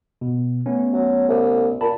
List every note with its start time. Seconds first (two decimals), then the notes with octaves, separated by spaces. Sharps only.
0.21 B2
0.66 A3 B3 C#4
0.93 F#3
1.28 C2
1.81 A#2 A5 B5